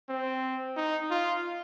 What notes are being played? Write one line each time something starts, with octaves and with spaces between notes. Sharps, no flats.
C4
D#4
F4